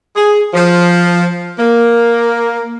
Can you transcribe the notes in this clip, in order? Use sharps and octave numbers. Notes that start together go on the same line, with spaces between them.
G#4
F3
A#3